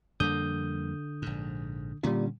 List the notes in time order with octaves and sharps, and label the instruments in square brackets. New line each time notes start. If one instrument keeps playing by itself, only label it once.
[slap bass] F2 G3 A#3 [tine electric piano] D3 D#6 G6
[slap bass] A#1 G#2
[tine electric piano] A#2 G3 [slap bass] D3 C#4